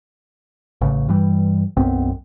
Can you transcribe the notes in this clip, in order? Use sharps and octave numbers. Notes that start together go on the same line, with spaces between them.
A1 C#3
G2 E3 G3
B1 F#2 B3 C4